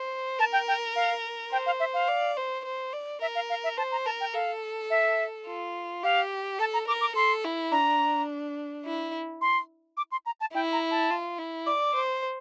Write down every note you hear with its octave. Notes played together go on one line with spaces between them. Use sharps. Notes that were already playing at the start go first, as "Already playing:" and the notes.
Already playing: C5
A#4 A5
G5
G5
F5
C5 G5
F5
E5
F5
D5
C5
C5
D5
A#4 E5
F5
F5
E5
C5 A5
A#5
A#4 A5
G5
A4 F5
E5
F4
G4 F5
A4 A5
A#5
A#4 D6
D6
A4 C6
E4
D4 A#5
E4
C6
D6
C6
A#5
A5
E4 G5
A#5
A5
F4
E4
D5 D6
C5